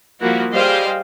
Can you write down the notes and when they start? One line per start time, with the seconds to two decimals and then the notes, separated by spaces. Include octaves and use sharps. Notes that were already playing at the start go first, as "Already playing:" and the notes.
0.20 F3 G3 A#3 E4 F#4
0.53 G3 G#4 C5 D#5 F5 G5